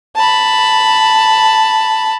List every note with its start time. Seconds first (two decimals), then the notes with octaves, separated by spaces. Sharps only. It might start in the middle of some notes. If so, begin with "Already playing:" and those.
0.16 A5 B5